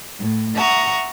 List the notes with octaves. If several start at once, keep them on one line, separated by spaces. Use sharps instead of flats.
A2
E5 F#5 A#5 C#6 D#6